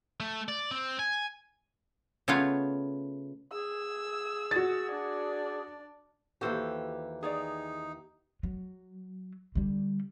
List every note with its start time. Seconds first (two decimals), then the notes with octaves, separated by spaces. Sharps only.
0.20 A3
0.48 D5
0.71 C4
0.99 G#5
2.28 C#3 A3 B3 F4 C#5
3.52 G#4 E6
4.51 F#4 A6
4.91 D4 D5
6.41 D#2 E3 F#4 G4 A4 C5
7.23 D#4 G#4 C#5 D5
8.43 F#3
9.55 D3 G3